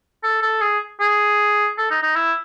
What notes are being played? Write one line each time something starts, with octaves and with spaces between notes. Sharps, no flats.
A4
A4
G#4
G#4
A4
D#4
D#4
E4